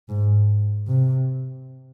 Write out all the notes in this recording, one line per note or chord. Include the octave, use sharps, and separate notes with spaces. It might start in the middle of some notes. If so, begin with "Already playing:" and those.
G#2
C3